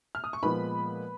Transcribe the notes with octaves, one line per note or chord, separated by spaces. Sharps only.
F6
D#6
C#6
A#2 F3 G#3 B3 B4 B5